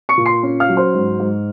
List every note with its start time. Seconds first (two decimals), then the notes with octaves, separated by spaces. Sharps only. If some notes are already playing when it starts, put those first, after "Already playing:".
0.09 C#6 C#7
0.17 A#2
0.26 C6 C7
0.43 C#4
0.60 F5 F6
0.69 F#3
0.77 C5 C6
0.94 G#2
1.19 G#2